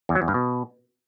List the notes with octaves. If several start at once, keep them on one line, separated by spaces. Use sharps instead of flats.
E2
F#3
E2
G2
B2